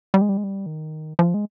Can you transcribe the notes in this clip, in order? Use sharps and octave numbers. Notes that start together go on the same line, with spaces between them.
G3
G#3
G3
G#3
G3
D#3
F3
G#3